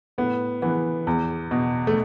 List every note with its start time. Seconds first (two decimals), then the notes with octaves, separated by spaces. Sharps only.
0.18 A2 B3
0.62 E3 B3
1.07 E2
1.51 B2
1.87 A3